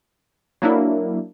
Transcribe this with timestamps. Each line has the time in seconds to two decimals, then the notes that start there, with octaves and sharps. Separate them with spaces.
0.62 F#3 A#3 D4 E4